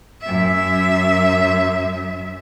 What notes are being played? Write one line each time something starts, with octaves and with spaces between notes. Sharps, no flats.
F#2 E5